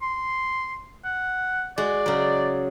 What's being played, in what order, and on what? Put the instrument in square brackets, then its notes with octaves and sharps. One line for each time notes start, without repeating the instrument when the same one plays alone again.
[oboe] C6
F#5
[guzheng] G#3 F#4 [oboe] D5
[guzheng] C#3 F#3